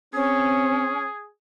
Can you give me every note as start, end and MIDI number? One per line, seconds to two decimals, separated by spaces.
0.14 0.92 60
0.14 1.02 61
0.14 1.27 68